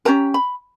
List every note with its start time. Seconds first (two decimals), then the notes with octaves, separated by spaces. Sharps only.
0.05 C#4 G4 A#4 A#5
0.34 B5